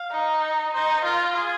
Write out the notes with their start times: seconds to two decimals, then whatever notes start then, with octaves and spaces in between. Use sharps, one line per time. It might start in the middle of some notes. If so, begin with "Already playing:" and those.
Already playing: F5
0.11 D#4
0.74 D#4 C5
1.04 F4 A#4
1.36 G#4